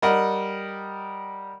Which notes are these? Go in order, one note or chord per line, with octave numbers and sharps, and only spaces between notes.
G3 A#4 D#5 F#5